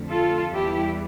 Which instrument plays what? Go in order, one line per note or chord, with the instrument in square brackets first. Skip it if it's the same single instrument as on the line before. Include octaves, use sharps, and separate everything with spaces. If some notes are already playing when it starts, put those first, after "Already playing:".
Already playing: [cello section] F2 D3 A3
F4 A4
E2 E3 G3 E4 G4